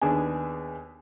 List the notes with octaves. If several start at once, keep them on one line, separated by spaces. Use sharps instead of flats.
D#2 B3 D4 G#4 G#5